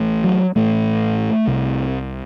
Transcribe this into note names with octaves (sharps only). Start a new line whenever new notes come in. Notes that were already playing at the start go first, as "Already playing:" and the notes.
Already playing: A1 A2
F#3
A1 A2 A3
C2 C3